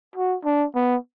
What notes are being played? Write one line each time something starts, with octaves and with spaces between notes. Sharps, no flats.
F#4
D4
B3